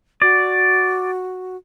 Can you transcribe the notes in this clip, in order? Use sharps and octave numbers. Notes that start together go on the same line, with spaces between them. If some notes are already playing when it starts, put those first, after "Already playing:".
F#4 D5